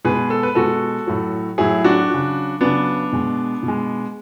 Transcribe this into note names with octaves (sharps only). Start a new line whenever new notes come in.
B2 G#3 G#4 B4
A4
B4
B2 G#3 F#4 A4
A2 F#3
A2 F#3 E4 G#4
D4 F#4
C#3 F#3
C#3 F#3 B3 D4
B2 G#3
B2
G#3